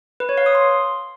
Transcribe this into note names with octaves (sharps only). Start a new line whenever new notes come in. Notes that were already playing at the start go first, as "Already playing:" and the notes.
B4
C#5
F5
D#6
C6